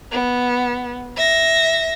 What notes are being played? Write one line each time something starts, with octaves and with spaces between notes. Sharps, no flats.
B3
E5 A#6